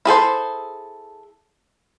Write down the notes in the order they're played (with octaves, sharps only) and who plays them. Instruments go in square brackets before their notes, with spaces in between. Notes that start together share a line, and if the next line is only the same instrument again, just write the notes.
[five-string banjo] E4 G#4 A4 C5